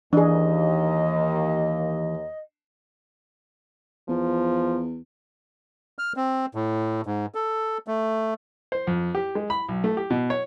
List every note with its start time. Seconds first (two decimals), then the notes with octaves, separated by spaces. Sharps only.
0.13 D#2 E3 D4 G#4 D#5
4.08 E2 F3
5.99 F6
6.17 C4
6.55 A2
7.06 G#2
7.35 A4
7.87 A3
8.72 C5
8.87 F2
9.15 G4
9.35 G#3
9.50 B5
9.68 B1
9.84 A3
9.97 G4
10.10 B2
10.30 C#5